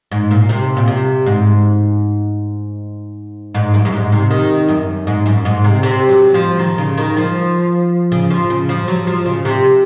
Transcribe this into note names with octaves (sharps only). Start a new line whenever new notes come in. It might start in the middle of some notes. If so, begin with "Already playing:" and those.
G#2
A#2
C3
A#2
C3
G#2
G#2
F#2
F#2
G#2
C3
D#3
F#2
G#2
F#2
G#2
C3
C3
F#3
F3
D#3
C#3
D#3
F3
C#3
F3
C#3
F3
F#3
F3
C#3
C3